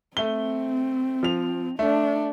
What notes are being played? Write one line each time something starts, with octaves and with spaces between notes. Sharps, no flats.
A3 C4 G7
F3 F7
A3 D4